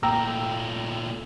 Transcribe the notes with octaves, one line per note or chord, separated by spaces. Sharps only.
A#2 A3 G5 A#5 E6